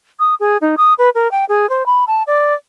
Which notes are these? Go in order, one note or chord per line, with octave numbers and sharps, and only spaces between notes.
D#6
G#4
D#4
D#6
B4
A#4
G5
G#4
C5
B5
A5
D5